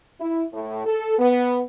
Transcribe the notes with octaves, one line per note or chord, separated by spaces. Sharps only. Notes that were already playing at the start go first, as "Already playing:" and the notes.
E4
A2
A4
B3